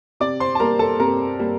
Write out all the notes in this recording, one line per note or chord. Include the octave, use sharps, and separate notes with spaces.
C3 D5 D6
C5 C6
A5
G3 A#3 A#4 A#5
A4 A5
C3 A#4 A#5
G3 A#3